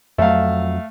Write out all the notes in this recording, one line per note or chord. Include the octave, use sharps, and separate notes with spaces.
F2 F#3 A3 F5